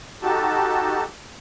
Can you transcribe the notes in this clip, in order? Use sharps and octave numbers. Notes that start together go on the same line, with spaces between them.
D#4 F#4 G4 A4 A5